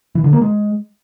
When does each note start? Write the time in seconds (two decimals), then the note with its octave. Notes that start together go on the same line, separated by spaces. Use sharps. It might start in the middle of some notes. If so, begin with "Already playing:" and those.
0.15 E3
0.24 D3
0.33 A#3
0.42 G#3